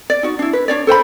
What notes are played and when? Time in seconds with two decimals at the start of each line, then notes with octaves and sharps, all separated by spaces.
0.10 D5
0.23 D#4 F#4
0.39 D4 E4
0.53 B4
0.68 D4 C#5 D5
0.87 A4 C5 G5 B5